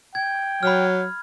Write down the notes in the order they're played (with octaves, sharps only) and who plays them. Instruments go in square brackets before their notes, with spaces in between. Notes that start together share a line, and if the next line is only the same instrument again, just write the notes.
[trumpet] G5 [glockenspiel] G#6
[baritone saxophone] F#3 [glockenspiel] B5 F6